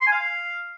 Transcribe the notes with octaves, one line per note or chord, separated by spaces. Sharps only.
C6
G#5
F5